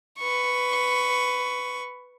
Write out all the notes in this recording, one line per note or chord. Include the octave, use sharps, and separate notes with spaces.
B4 C#6